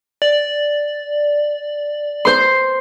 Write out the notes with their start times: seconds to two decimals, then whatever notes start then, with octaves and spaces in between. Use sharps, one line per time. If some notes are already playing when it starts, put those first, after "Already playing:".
0.22 D5
2.25 C5 C6